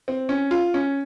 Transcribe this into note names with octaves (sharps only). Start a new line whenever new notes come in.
C4
C#4
F4
C#4